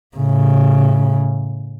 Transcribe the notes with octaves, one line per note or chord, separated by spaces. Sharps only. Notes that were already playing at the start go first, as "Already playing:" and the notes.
A2 C#3